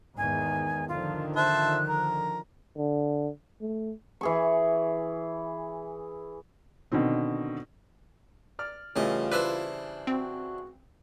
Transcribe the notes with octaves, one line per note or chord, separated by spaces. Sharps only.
E2 G#2 D#3 G#5
D3 D#3 F3 F4
C5 E5 A5 F#6
A#4
D3
A3
E3 G#4 C#6
B2 D3 D#3 C4
D5 F6
A2 C#3 E3 G3 F4 D#5
D4 E4 B4 C5
C4 F#4